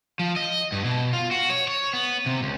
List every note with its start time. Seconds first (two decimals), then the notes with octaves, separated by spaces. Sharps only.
0.19 F3
0.36 D#5
0.72 G2
0.84 B2
1.13 F4
1.31 F#4
1.50 C#5
1.68 C#5
1.93 B3
2.26 C3
2.43 C#2